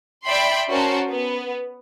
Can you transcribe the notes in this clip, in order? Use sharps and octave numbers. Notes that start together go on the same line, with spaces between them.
D5 E5 G5 B5 C6
C#4 F#4 A#4 C5 A5
B3